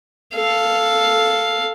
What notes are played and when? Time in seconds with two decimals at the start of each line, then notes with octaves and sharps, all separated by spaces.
0.36 A4 F5